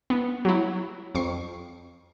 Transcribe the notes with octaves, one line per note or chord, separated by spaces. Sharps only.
B3
F#3 E4
F2 C#6 C7